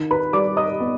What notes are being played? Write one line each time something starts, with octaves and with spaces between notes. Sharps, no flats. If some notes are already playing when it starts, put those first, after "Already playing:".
Already playing: D#3
B4 B5
G3 D5 D6
D#5 D#6
B3